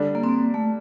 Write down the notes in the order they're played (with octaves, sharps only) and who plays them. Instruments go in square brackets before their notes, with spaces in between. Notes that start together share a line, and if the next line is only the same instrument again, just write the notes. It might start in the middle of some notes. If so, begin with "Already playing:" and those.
Already playing: [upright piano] D3 G3 D4
[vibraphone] A#3
C4
A#3
A3